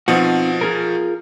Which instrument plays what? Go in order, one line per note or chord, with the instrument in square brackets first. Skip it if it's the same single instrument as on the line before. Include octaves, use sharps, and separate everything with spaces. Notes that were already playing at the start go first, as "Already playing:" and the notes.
[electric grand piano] B2 F3 [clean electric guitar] C4 D#4 F#4
[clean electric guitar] F4 G#4 A#4